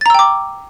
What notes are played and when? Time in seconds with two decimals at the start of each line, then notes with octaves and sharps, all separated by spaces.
0.01 A6
0.06 A#5
0.10 E6
0.14 G5
0.19 D6